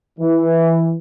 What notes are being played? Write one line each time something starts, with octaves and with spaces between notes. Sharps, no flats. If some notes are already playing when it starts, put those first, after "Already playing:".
E3